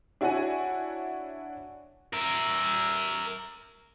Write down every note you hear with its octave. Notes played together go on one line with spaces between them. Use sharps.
D4 E4 F#4 C#5 F#5 G#5
A#4 E5